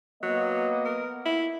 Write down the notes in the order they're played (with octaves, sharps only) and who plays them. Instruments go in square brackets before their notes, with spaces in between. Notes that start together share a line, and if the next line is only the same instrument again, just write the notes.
[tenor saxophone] F#3 [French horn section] A#3 B3 D#5
[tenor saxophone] A#4
E4